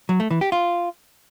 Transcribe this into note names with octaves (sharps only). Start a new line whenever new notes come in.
F#3
A3
E3
G4
F4